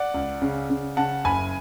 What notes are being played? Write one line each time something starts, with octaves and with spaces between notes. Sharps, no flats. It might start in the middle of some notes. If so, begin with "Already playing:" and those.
Already playing: D5 F#5
C#2
C#3
C#3
C#3 F#5 A5
F#1 G#5 B5